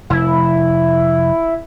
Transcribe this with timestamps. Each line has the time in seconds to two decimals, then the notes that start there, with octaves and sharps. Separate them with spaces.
0.10 F1 E4